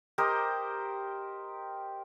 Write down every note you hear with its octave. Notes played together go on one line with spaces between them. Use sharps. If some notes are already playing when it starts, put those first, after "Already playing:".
G4 A#4 C5 D#5